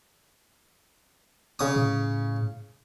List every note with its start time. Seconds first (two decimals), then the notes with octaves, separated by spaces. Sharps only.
1.59 C#3 D#6
1.76 A2